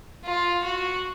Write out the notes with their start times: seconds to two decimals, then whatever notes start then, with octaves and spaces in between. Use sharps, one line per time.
0.25 F4
0.63 F#4